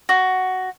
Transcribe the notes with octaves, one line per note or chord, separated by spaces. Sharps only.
F#4